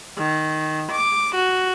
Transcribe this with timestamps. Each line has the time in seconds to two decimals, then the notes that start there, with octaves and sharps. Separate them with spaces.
0.18 D#3
0.90 D6
1.35 F#4